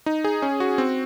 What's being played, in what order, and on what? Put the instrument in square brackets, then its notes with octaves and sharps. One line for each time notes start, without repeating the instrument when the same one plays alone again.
[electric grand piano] D#4
G#4
C#4
F#4
C4